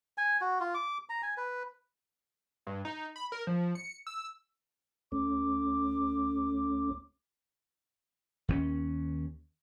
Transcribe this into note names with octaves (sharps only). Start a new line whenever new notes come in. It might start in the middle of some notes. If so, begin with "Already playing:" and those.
G#5
F#4
F4
D6
A#5
G#5
B4
G2
D#4
B5
A#4
F3
C#7
E6
D2 A3 C#4 D6
D#2 A#3 C#4